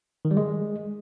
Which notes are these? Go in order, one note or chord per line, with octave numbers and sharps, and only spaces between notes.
D#3
G3
G#3